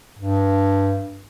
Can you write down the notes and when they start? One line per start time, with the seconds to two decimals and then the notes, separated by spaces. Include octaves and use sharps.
0.19 G2